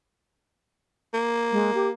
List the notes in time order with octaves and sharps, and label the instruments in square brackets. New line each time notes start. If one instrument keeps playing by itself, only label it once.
[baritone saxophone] A#3
[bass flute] G#3
G4